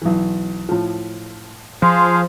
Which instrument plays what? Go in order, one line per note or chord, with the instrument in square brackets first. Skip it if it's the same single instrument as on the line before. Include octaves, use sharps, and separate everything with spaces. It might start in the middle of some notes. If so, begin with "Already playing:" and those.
[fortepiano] B1 E3
A2 F3
[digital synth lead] F3 [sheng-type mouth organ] G#4 C5 F5 [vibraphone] C6